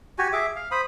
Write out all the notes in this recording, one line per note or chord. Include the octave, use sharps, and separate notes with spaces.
F#4 G4 G#5
G#4 E5 D6
F5
C5 B5 D#6